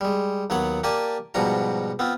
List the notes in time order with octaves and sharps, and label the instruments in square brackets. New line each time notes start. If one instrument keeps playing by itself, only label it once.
[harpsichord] G3 G#3
D#2 F#3 B3 C#5 F#5
A#3 G4 D5 G#5 A5
G#2 B2 F3 G3 F#4 A#5
B3 C4 F4